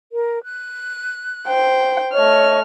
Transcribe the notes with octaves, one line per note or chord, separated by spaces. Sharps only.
A#4
F#6
C5 G5
A3 C#5 D#5 C#6 F6